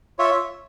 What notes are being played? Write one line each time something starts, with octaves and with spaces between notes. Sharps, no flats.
F4 C#5 E5